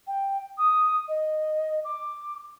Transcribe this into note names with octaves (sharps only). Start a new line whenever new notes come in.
G5
D#6
D#5
D6